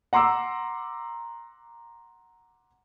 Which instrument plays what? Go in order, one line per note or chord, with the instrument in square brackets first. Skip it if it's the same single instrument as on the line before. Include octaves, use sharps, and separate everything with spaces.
[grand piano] F#5 A#5 C6 D6 E6